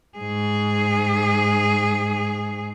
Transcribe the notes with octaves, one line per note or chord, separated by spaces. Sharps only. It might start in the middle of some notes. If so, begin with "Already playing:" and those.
G#2 G#4